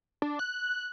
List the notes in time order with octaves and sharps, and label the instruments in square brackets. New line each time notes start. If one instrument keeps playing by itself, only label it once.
[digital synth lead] D4
F#6